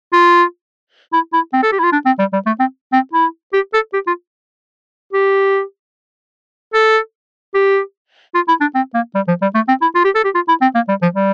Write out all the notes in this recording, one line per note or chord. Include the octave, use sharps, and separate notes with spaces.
F4
E4
E4
C4
A4
G4
E4
F4
D4
C4
G3
G3
A3
C4
C4
E4
G4
A4
G4
F4
G4
A4
G4
F4
E4
D4
C4
A#3
G3
F3
G3
A3
C4
E4
F4
G4
A4
G4
F4
E4
C4
A#3
G3
F3
G3